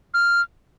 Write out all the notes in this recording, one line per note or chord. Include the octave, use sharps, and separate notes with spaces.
F6